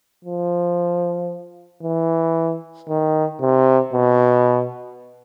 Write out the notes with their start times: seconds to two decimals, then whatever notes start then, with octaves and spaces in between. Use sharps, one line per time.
0.25 F3
1.83 E3
2.88 D#3
3.41 C3
3.93 B2